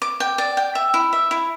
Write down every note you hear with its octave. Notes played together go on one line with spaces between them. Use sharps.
D6
G5
D5
G5
E5
E4
E5
E4